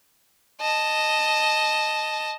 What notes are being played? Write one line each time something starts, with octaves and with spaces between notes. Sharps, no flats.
D#5 A5